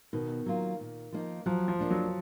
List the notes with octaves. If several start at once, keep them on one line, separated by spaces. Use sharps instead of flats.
B2 D#3
F#3 A#3 F4
A#2
F3 A#3 D#4
F3 F#3
F3
A#3 D4 F4
F#3